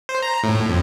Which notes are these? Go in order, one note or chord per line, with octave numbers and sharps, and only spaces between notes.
C5
A#5
A2
F2